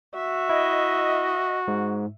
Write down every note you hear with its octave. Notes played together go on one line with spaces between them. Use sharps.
F#4 E5
E4 D#5
G#2